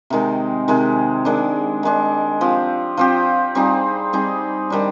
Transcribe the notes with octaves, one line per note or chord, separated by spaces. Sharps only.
C3 D#3 G#3
C3 D#3 G#3
D#3 G#3 D4
D#3 G#3 D4
F3 C4 G4
F3 C4 G4
G3 C4 D#4 G#4
G3 C4 D#4 G#4
D#3 G3 D4